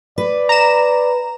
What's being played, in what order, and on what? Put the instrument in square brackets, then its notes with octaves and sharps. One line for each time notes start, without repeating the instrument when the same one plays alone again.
[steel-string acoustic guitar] B4 [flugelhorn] D5
[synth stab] A#5 E7